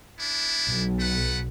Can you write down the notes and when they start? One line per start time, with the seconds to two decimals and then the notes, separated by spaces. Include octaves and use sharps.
0.18 B3 D4 E4
0.67 B1
0.99 A3 B4 F#5